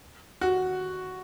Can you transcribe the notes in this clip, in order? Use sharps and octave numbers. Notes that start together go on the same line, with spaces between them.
F#4